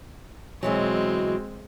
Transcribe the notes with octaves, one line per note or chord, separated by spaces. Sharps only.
B2 E3 F#3 G#3 C4